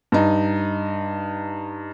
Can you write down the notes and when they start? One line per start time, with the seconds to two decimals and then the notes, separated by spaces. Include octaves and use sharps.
0.12 G2 D#4